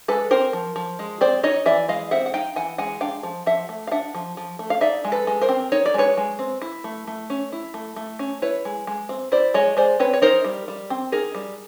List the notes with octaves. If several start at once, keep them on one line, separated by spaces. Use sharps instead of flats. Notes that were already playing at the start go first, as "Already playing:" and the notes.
G#3 A4 B4
C4 A#4 C5
F3
F3
G#3
C4 C5 D5
D#4 C#5 D#5
E3 D5 E5
G#3 D#5 F5
C4 E5 F#5
F#5
D#4 F5 G5
E3 F#5 G#5
G#3 F#5 G#5
D4 F5 G5
F3
F3 E5 F#5
A3
F5
D4 E5 F#5
F3
F3
A3
F5
D#4 D5 E5
G#3
A4 B4
G#3
A#4 C5
C4
D#4 C#5
D5
G#3 B4 C#5
G#3
C4
E4
A3
A3
C#4
E4
A3
A3
C#4
E4 B4 C#5
G#3
G#3
C4
E4 C5 D5
G#3 C#5 D#5
G#3 C5 D5
C4 B4 C#5
C#5
D#4 A#4 C5
G3
G3
C4
D#4 G#4 A#4
G3